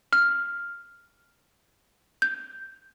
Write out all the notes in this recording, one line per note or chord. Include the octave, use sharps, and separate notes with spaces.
F6
G6